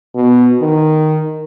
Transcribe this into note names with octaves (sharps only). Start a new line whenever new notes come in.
B2
D#3